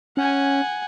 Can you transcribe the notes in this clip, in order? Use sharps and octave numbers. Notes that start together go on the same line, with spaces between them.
C#4 F#5 G#5